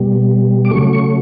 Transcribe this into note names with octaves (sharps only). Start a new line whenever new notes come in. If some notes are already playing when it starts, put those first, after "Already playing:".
Already playing: B2 G3
D6
C#3 F#3 A3 C#6
C#6